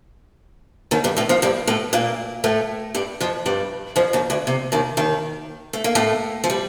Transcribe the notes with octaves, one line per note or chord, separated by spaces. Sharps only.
D#2 D#3
G2 G3
A2 A3
F2 F3
G2 G3
A2 A3
A#2 A#3
A2 A3
G2 G3
F2 F3
G2 G3
F2 F3
D#2 D#3
D2 D3
C3
D#2 D#3
D#2 D#3
A3
A#3
A2 A3
F3
G3